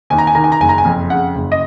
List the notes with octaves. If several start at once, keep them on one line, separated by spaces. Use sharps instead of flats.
D#2 G#5
A#5
G#5
D#3 A#5
G#5
A#5
F#1 G#5
A#5
G#5
F2
C#3 F#5
F#1
D#5